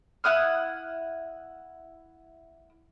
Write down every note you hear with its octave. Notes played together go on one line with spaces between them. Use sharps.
E4 F#5 D#6 F6